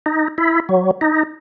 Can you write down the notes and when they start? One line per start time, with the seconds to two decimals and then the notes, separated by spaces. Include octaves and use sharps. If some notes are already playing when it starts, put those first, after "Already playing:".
0.06 D#4
0.38 E4
0.69 F#3
1.01 D#4